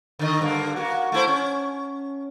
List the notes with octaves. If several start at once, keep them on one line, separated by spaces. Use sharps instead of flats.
D3 D#3 D#5
G2 D3 A#3
A#3 F#4
A3 E4 C5
C#4